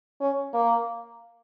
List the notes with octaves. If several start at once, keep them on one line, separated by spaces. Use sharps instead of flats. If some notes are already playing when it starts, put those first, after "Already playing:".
C#4
A#3